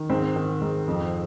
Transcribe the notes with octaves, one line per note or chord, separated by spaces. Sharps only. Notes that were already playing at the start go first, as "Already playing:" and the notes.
Already playing: D#3
G#2 C4
D#3
G#2
F2